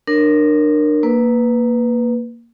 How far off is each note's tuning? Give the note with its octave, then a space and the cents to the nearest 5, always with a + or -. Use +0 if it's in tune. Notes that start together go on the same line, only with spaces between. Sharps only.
D4 +30 A#4 +0 C#5 -10
A#3 +0 B4 +0